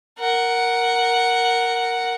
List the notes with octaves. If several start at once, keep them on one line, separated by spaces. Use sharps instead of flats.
A#4 F#5